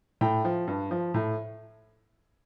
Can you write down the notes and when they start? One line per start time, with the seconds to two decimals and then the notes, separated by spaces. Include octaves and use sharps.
0.21 A2 G5
0.44 F3
0.67 G2
0.91 F3
1.14 A2